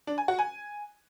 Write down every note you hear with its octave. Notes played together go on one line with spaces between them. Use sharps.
D4
G#5
F#4
G#5